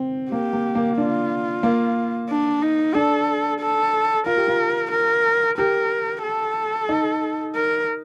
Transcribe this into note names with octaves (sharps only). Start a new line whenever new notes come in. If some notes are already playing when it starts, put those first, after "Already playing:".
Already playing: C4
A#3 G4
A#3
A#3
D4 F4
A#3
D4
D#4
D4 A4
A4
F4 A#4
G4
F4
A#4
G4 A#4
A4
D#4
A#4